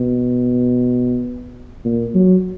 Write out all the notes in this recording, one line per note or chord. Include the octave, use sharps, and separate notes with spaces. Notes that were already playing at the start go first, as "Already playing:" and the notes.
Already playing: B2
A#2
F#3